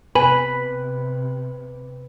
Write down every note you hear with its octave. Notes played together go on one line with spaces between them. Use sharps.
C3 B4 G#5 B5